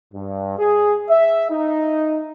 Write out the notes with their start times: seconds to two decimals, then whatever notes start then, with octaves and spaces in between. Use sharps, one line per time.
0.14 G2
0.58 G#4
1.09 E5
1.50 D#4